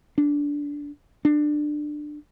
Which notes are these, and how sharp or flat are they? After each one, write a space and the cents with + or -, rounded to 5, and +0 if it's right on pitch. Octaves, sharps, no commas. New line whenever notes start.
D4 -15
D4 +20